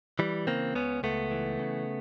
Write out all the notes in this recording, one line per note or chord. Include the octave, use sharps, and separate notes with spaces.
E3 G3
C#3 A#3 C4
C#2 B3 C#4
C#2 A3 B3
E3
C#3